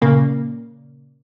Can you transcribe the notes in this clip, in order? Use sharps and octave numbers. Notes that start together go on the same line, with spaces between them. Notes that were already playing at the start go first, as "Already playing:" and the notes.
A#2 C#3 A#3